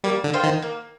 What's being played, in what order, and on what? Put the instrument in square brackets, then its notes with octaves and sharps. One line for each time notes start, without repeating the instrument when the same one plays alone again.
[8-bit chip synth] G3 [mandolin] A#3
[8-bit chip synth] D3
[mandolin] F4 C5 G5
[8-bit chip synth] D#3
[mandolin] A#3